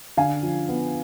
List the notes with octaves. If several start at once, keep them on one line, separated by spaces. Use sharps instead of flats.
D3 F5 G#5
F3
B3